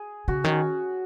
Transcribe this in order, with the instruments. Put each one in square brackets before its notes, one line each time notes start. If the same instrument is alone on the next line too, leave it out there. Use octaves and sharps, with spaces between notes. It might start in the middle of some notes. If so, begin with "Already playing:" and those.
Already playing: [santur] G#4
[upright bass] C#3 [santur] F#4
[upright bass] D#3 [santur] C#4